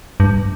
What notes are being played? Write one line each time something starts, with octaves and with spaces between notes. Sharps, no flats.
G2